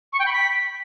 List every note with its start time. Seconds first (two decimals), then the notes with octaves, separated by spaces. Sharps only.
0.13 C#6
0.19 G5
0.26 B5
0.33 B6